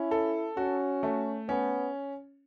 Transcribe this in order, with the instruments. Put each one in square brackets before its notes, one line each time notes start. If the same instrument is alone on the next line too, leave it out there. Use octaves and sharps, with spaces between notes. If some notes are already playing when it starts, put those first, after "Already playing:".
Already playing: [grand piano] C#4 [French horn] E4
[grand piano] A4
[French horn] C#4 [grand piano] F#4
[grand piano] A3
[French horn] B3 [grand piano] C#4